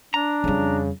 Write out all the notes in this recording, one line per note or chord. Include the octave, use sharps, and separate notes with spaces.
D4 A#5
F2 C#3 G3